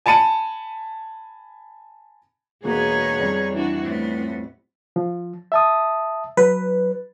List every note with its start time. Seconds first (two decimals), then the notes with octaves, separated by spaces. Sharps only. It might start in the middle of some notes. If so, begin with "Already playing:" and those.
0.06 G#5 A5 B5 C#7 D#7
2.64 E1 A#3 B3 D#4 F#4 G#4 C#5
3.19 F2 G3
3.52 E3 D4 F#4
3.83 A2 B3 C4
4.96 F3
5.52 E5 A5 D#6
6.37 F#3 B4